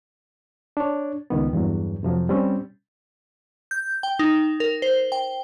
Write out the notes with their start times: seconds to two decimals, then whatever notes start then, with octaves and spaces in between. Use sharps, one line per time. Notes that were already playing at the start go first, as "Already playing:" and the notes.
0.77 D4 C#5
1.30 C#2 D#3 B3
1.53 E2 G2 F#3
2.03 F2 C3 F3 F#3
2.29 G3 C4 C#4
3.71 G6
4.03 G5
4.19 D#4
4.60 A#4
4.82 C5
5.12 G5